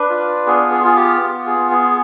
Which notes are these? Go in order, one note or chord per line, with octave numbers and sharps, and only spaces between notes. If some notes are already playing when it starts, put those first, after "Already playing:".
Already playing: D4 B4
F4
B3 G#4
G#4
F4 G#4
G4
B3
G#4
B3
G#4